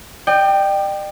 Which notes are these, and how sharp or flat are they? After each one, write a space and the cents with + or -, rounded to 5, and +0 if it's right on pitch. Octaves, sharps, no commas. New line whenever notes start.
D5 +45 G5 +0